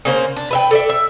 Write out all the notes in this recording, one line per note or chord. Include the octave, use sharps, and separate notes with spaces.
C#3 A#3 C5
D4
B4 E5 G5
A4 D5 E5
E5